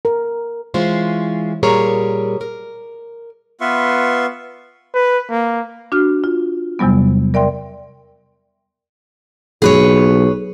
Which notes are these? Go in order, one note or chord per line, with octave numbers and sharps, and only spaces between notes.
A#4
E3 G#3 C#4 F4 C5
A#2 G3 G#4 A#4 C#5 A#5
A#4
B3 F4 B4 E5 C6 C#6
B4
A#3
D4 F#4 F6
F4
E2 C3 F#3 G3 B3
A#4 D5 E5 G5 C6
B1 G#4 B4 C#5